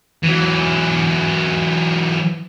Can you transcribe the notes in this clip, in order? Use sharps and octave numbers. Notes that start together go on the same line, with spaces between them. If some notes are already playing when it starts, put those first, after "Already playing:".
E3 F#3